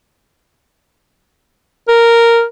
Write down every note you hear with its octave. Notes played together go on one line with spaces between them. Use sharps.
A#4